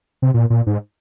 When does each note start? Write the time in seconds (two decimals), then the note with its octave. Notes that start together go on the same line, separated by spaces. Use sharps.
0.22 C3
0.34 A#2
0.50 A#2
0.67 G#2